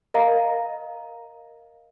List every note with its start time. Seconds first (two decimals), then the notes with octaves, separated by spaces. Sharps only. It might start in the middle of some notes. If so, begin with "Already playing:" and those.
0.14 A#4 D#5 F5 A#5